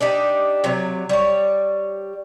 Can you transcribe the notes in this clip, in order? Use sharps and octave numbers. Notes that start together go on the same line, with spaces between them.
D4 D#4 G4
C3 F#3
G3 C#5